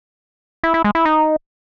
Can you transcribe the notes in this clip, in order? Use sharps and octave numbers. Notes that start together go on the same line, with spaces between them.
E4
E4
G#3
E4
D#4